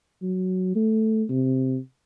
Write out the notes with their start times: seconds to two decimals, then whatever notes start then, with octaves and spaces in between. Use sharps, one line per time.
0.22 F#3
0.75 A3
1.30 C3